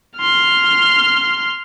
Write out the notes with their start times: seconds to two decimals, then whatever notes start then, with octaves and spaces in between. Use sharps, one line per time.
0.17 C6 F6